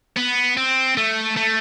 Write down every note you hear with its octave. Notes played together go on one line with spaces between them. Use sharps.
B3
C4
A3
A3